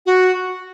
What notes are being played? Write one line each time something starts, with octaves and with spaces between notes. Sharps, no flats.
F#4